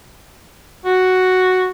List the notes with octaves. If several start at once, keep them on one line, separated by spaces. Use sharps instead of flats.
F#4